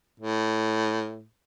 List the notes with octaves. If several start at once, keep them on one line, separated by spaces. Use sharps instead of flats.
A2